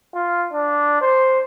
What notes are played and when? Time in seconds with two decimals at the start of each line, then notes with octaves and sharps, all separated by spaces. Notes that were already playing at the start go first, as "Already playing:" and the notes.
0.14 F4
0.53 D4
1.01 C5